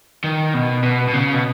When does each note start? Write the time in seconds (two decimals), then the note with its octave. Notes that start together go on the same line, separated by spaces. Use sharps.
0.24 D#3
0.54 B2
0.83 B2
1.08 B2
1.13 C#3
1.34 B2